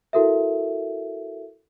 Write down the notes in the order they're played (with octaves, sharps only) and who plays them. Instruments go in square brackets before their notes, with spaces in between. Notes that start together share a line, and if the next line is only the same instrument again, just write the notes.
[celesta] E4 F#4 A4 A#4 E5